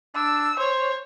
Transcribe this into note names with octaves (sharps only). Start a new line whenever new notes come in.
D4 E6
C5 C#5